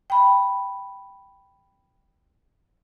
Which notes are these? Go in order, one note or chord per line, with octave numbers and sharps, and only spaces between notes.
G5 B5